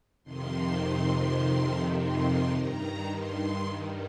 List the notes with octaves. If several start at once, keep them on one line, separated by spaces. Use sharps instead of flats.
F2 C3 D#3 C6
C6
G2 D#3 A#5
C6